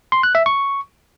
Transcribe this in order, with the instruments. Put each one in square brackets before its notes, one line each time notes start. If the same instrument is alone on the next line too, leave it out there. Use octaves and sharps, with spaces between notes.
[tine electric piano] C6
F#6
E5
C#6